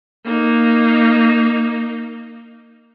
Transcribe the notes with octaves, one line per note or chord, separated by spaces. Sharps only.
A#3 D#4